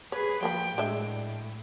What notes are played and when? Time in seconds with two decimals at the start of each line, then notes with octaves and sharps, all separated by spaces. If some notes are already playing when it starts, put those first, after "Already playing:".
0.12 G#4 B4 C#5
0.43 F3 A#3 A#4 G5 B5
0.78 A2 G#3 D4 E5